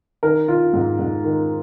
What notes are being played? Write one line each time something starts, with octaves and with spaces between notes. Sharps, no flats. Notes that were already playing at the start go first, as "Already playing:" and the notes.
D#3 A#4
D#3 F4
G#2
G#2
D#3